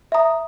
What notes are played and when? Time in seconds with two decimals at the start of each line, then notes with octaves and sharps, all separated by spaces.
0.12 E5 A#5 D#6